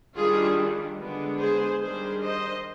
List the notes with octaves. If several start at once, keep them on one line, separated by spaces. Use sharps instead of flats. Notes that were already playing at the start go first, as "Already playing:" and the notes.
D#3 G3 D4 F4 G#4
D3 G#3 B3 D4
G#4 C5
D#3 G3 D4 G#4 C5
C5 D#5